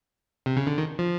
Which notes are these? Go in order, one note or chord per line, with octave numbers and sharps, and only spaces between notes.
C3
C#3
D3
D#3
F3